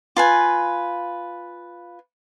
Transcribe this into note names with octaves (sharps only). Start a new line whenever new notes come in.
F4 B4 G#5